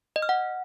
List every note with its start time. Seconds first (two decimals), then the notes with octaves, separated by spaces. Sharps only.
0.16 D#5
0.22 F6
0.29 F#5